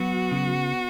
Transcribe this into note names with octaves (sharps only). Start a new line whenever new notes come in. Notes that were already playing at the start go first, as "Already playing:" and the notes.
Already playing: F#3 B3 F#4
C#3